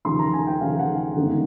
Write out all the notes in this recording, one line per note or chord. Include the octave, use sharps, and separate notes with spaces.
D#2 C#3 F3 C6
A#5
G#5
G5
D#2 C#3 F3 F5
F#5
G1 F#2 D#3 G#3